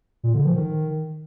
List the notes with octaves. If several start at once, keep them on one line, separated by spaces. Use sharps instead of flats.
A#2
D3
F3
D#3